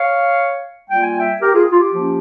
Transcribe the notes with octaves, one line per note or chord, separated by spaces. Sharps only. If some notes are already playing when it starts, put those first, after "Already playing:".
Already playing: C#5 F5
G3 A#3 F4 G5
G#5
E5 G5
G4 A#4
F4 G#4
F4
G4
F3 A#3 C#4 F4